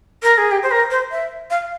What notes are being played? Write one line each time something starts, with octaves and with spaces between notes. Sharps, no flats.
A#4
G#4
G4
C5
A#4
C5
E5
F5